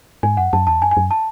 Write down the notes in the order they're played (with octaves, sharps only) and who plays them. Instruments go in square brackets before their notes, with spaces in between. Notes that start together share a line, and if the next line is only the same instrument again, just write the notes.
[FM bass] G#2 [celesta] G#5
[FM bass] F#2 [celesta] F#5
[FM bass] F#2 [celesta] A5
[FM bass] E2 [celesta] A5
[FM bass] F#2 [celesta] G#5
[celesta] G#5
[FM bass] F#2
[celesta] A5